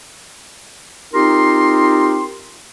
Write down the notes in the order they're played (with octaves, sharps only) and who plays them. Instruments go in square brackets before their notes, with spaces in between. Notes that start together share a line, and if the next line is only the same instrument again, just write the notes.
[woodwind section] C4 D#4 F4 G4 A#4 C6